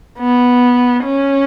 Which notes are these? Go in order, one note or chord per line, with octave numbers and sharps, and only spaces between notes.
B3
C#4